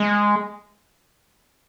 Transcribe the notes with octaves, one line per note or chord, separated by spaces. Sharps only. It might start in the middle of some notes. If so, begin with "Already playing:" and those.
Already playing: G#3